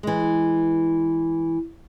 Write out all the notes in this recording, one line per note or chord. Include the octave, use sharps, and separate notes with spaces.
E3 G#3